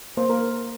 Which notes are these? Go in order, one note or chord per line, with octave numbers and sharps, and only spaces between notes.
A#3 C5
A#4